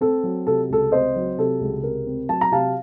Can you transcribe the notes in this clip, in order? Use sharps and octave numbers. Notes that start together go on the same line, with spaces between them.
C4 A4
F#3
C3 A4
C#2 A4
C4 C5 D#5
F#3
C3 A4
C#2
C3 A#4
C4
F#3 A5
A#5
C3 F5 A5